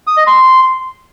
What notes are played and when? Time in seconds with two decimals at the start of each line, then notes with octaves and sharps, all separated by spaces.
0.07 D#6
0.17 D#5
0.27 C6